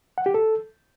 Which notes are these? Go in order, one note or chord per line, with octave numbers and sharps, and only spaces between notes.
F#5
G4
A4